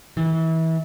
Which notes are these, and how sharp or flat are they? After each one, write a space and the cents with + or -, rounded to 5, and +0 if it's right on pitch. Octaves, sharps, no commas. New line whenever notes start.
E3 -30